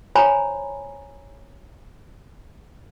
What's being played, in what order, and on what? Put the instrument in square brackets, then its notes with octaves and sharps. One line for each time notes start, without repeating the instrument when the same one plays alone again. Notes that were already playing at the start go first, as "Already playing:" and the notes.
[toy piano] C5 C#5 G#5 A#5 B5